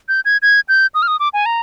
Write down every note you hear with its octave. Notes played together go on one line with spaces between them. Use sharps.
G6
G#6
G#6
G6
D#6
F6
D#6
D6
G#5
A#5